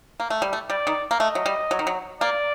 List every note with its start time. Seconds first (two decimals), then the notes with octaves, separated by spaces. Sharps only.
0.20 A#3
0.30 A3
0.42 G3
0.53 A3
0.70 G3 D5
0.87 D#3
1.11 A#3
1.20 A3 D#5
1.35 F#3
1.46 G3
1.71 F#3
1.79 D#3
1.87 F#3
2.21 A#3 D5